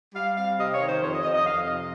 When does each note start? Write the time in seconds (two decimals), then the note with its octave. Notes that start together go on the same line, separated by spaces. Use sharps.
0.13 G3 F5
0.35 C4 F5
0.57 C3 D#5
0.72 C#5
0.79 D#3
0.86 C5
1.00 F2 C#5
1.12 D#5
1.22 F2 D#5
1.33 D#5
1.44 F2 F5
1.66 C3 D#5